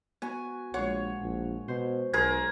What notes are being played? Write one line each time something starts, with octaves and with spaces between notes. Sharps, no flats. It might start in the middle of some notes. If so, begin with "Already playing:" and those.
B3 F#4 G#5
A#1 G#3 F4 C#5 F#5
A#1
B2 C5
B1 G#4 A#4 C6 G#6